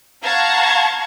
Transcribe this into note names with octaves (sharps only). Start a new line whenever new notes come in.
F5 F#5 A5 A#5 C#6 G#6